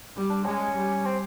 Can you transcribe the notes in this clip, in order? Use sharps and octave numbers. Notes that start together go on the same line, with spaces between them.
G3
D4
G#3 C#4
G3
C4